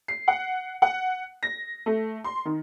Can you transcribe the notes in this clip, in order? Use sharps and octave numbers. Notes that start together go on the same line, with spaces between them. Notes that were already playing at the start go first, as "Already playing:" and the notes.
C7
F#5
F#5
A#6
A3
C6
D#3